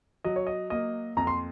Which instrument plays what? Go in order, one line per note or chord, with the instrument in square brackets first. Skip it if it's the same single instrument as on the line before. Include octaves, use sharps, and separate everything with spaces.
[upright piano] F#3 [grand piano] D#5
[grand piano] C#5
D#5
[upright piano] A#3 [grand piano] D#5
[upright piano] F2 [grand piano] A#5
[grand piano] C6